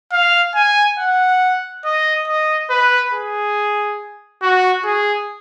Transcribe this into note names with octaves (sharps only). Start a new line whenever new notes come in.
F5
G#5
F#5
D#5
D#5
B4
G#4
F#4
G#4